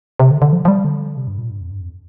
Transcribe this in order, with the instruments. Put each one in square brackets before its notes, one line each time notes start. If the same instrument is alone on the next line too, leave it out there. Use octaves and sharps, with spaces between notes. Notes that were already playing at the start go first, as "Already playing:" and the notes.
[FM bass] C3
D3
D3
F3
F3
G3
D3
C3
G2
A#2
G2
F2
G2
F2